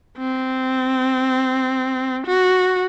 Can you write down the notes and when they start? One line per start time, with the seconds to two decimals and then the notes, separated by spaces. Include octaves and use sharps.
0.18 C4
2.27 F#4